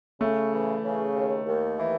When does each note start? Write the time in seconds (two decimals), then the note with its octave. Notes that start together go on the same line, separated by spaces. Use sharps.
0.21 C#3 A3
0.53 E3
0.84 C#3
1.16 D#2
1.47 D#2
1.79 E3